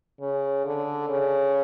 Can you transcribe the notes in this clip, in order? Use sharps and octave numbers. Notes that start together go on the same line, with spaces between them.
C#3
D3
C#3